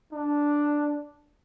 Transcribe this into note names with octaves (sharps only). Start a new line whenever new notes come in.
D4